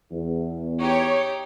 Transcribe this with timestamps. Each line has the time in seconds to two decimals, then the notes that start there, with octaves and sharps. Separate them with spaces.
0.11 E2
0.79 D#4 G4 C#5